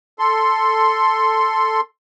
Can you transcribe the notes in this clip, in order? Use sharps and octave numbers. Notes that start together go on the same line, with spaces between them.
A4 C6